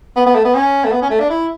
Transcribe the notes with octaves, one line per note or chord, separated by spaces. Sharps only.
B3
B3
A3
B3
C#4
A3
B3
C#4
A3
D4
E4